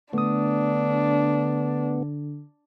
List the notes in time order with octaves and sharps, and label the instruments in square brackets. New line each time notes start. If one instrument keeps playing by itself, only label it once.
[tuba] D3 [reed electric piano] A3 D#6 [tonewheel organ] B3 [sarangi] D4